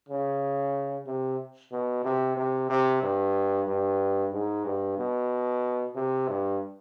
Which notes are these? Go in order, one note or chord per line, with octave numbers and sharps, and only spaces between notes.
C#3
C3
B2
C3
C3
C3
G2
G2
G#2
G2
B2
C3
G2